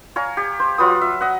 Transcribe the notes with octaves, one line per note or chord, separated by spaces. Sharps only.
C#5 F5 G#5 A#5
G4
C5
F#3 F4 B4 D#6
E5
D#5 F#5